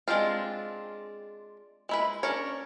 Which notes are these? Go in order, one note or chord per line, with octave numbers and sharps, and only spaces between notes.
G#3 C4 D4 F4
G#3 E4 B4
C#4 D4 A#4 C#5